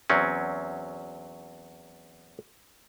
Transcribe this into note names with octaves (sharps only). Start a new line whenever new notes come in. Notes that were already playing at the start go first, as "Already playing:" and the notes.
E2 F#3 C4 C#4